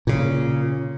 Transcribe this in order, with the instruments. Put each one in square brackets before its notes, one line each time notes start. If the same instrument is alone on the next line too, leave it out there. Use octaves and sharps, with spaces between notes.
[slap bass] A#2 C#3